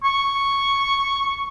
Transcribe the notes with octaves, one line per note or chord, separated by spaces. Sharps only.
C#6